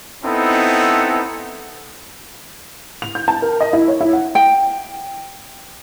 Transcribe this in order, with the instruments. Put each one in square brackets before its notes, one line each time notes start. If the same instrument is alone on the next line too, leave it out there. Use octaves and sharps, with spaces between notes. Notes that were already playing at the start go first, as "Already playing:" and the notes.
[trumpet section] B3 C4 D#4 E4 A4
[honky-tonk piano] F7
G6
A5
A#4
D#5
E4
C#5
E4
F#5
[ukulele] G5